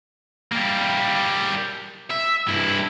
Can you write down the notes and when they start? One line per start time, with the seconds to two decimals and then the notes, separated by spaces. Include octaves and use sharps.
0.52 G3 A#3
2.11 E5
2.49 G2 E4